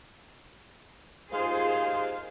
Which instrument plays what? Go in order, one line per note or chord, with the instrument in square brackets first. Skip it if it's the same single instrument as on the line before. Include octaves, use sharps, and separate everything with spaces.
[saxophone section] D#2 D#4 F5 [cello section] F4 G#4 C5